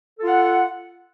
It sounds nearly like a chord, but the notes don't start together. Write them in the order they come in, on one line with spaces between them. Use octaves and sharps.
A4 F4 F#5